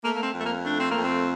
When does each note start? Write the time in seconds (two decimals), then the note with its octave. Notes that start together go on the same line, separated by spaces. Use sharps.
0.03 A3 A#3
0.14 A#3
0.23 C4
0.33 F2
0.38 A3
0.45 A#3
0.65 A3 D4
0.78 C4
0.91 A#3
0.96 F2
1.04 C4